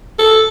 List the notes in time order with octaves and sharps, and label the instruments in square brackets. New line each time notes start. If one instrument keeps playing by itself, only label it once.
[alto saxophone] A4